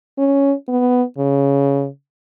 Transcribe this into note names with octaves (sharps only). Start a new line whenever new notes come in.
C#4
B3
C#3